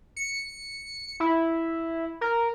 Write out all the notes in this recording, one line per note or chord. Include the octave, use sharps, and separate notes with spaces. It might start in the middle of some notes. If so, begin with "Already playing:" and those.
C#7
E4
A#4